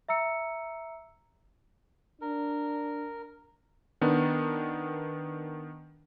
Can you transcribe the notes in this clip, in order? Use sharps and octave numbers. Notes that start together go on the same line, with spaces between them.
E5 A#5 E6 C#7
D4 A#4
D#3 B3 D4